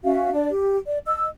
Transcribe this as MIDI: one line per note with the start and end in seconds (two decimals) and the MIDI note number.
0.04 0.31 61
0.04 0.31 66
0.04 0.31 76
0.04 0.31 77
0.32 0.48 62
0.32 0.48 74
0.50 0.77 67
0.86 0.98 74
1.06 1.27 75
1.06 1.27 88